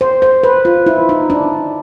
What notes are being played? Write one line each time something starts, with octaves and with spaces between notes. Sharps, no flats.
C5
C5
B4
F4
E4
D#4
D4